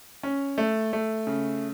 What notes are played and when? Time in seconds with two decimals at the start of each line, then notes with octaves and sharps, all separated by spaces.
0.23 C#4
0.58 A3
0.93 A3
1.27 C#3